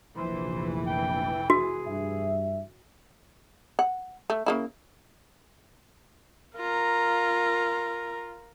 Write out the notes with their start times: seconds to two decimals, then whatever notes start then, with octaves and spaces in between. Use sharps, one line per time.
0.18 F1 A#1 E3 C5
0.86 G5
1.50 F#4 G#4
1.87 G2 E5
3.79 F#5
4.30 A3
4.46 C#3 A#3 E4
6.57 F4 A#4 A#5